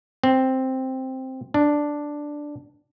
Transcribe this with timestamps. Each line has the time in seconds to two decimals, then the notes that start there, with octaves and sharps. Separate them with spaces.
0.24 C4
1.54 D4